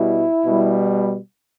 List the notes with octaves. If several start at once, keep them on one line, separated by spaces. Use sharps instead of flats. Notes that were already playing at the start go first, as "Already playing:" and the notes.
Already playing: B2 G3 E4
B2 G3